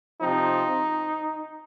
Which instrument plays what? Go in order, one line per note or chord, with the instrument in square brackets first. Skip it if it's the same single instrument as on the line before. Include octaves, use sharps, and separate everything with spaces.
[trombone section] C3 F3 C4 D#4